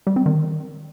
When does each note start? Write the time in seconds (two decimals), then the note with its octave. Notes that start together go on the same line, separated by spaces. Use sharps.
0.07 G3
0.16 C4
0.26 D#3